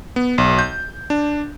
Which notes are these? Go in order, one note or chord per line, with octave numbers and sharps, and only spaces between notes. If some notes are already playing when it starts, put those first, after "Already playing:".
B3
B1
G6
D4